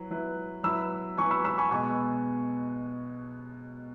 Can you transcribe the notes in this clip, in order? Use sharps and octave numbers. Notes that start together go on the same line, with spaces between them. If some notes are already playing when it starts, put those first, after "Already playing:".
Already playing: F#3 E4 B4
F#3 E4 B4
F#3 E4 B4 B5 E6
F#3 E4 B4 G#5 C#6
B5 E6
B5 E6
G#5 C#6
B2 G#3 B3 G#5 C#6